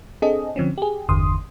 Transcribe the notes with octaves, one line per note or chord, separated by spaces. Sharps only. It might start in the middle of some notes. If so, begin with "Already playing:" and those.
C4 D4 G#4 A4 D#5
D3 F3 C4 C#4
G4 G#4
G1 E2 D3 C6 D#6